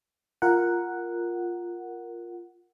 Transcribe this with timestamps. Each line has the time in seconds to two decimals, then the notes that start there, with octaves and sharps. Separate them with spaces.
0.42 F4 A#4 F#5